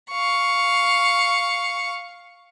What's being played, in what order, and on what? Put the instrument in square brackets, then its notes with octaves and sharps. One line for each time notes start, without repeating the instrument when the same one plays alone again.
[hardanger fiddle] F5 C#6